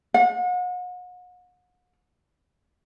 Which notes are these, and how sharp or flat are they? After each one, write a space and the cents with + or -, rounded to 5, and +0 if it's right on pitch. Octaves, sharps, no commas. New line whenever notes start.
F#5 -40